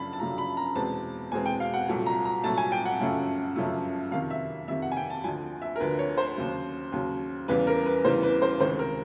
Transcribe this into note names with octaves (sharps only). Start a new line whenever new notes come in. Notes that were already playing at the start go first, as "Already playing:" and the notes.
Already playing: F#2 C#3 F3 A3 D4 A5 B5
A5
F#2 C#3 F3 A3 D4 A#5
B5
A#5
E2 B2 G#3 C4 A5
E2 B2 G#3 C4 G#5
G5
F5
F#5
C2 A#2 F#3 A3
A#5
A#5
C2 A#2 F#3 A3 A5
G#5
G5
F#5
G1 F#2 C#3 F3 A3
G1 F#2 C#3 F3 A3
F2 C3 D#3 F5
E5
F2 C3 D#3 E5
F#5
G#5
G5
A5
D2 D3 F3 G#5
E5
A#4
D2 D3 F3 B4
C#5
C5
D#2 C#3 F#3
D#2 C#3 F#3
E2 C#3 E3 G3 B4
A#4
B4
E2 C#3 E3 G3 C5
B4
C5
C#2 C3 D#3 C5
A#4